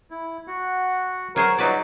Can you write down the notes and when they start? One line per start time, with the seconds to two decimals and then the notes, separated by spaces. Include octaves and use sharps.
0.11 E4
0.48 F#4 F#5
1.36 F#3 G#4 A#4 C5 C#6
1.58 F#3 D#4 F4 F#4 B4 D5